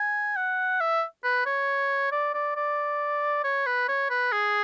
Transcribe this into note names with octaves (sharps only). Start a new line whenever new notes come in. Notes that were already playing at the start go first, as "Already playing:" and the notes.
Already playing: G#5
F#5
E5
B4
C#5
D5
D5
D5
C#5
B4
C#5
B4
G#4